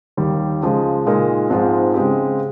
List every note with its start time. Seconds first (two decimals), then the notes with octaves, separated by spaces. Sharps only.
0.17 D#2 D#3 G3
0.61 C#2 C#3 F3 G#3
1.06 A#2 G#3 D#4 A#4
1.50 G#2 F3 G#3 C4 F4
1.94 C#3 G#3 C4 G4